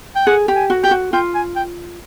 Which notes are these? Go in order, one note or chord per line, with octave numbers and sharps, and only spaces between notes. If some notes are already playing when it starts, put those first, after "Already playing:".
G5
G#4 F#5
G4
G#5
F#4
G4 G5
F#4
F4 G5
G#5
G5